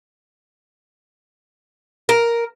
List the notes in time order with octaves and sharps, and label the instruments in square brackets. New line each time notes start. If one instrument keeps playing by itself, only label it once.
[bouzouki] A#4